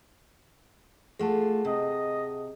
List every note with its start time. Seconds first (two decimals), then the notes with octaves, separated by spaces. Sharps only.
1.19 A3 F4 G#4 F#5 A5
1.65 C3 D#5